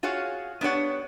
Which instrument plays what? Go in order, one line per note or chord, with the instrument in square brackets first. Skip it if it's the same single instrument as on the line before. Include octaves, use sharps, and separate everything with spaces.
[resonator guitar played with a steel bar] F4 F#4 G#4 C#5 F5
B3 D4 G4 C#5 F#5